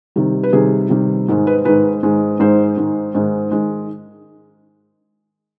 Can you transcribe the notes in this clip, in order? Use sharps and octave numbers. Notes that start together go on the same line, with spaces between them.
C3 D#3 G3
B4
C3 D#3 G3 G#4
C3 D#3 G3
G#2 D#3 G#3
B4
G#2 D#3 G#3 B4
G#2 D#3 G#3
G#2 D#3 G#3 C5
G#2 D#3 G#3
G#2 D#3 G#3
D#3 G#3